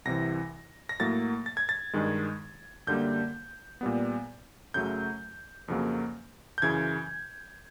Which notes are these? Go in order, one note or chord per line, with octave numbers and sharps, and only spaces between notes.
C2 C3 E3 A#6
A#6
A2 F#3 A#3 A6
A6
G#6
A6
G2 D#3 G#3
F#2 D3 G3 A#3 G6
A#2 G3 B3
F#2 C#3 F#3 A3 G6
F2 C#3 F#3 A#3
G6
F#2 C#3 E3 G#6